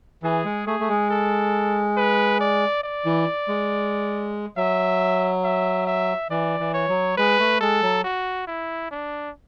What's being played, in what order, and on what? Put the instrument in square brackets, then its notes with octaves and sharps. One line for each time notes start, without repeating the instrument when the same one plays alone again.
[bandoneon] E3 [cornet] G#4
[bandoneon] G#3
[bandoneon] A3 [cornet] G#4
[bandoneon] A3
G#3
[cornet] A4
B4
D5
D5
[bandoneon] E3
G#3
[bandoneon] F#3 [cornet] E5
[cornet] E5
E5
[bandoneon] E3 [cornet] D5
[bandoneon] E3
[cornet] C#5
[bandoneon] F#3
[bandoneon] G#3 [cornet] B4
[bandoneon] A3
[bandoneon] G#3 [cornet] A4
[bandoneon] F#3
[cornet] F#4
E4
D4